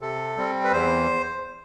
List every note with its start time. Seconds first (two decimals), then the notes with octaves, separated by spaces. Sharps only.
0.01 C3 A4
0.37 G3 C4
0.64 B4
0.71 E2 C5